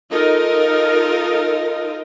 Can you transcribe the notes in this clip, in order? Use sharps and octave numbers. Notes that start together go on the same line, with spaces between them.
D#4 F4 A4 A#4 D#5